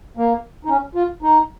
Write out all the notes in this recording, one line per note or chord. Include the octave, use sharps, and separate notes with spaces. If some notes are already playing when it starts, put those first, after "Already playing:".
A#3
D#4
C#4
F4
D#4